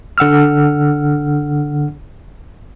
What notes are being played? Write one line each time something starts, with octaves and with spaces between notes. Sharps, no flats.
D3 F#5 E6 F6